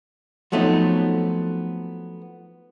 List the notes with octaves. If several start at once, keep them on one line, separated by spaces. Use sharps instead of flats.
F3 F#3 A3 B3 C4 D#4